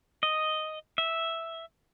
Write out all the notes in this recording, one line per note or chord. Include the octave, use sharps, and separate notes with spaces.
D#5
E5